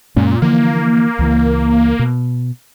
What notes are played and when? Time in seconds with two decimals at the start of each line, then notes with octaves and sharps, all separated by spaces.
0.16 F#2 A#2 G#3 C#4
0.42 D3 E3 F3 A#3
1.19 C#2 E3
1.99 B2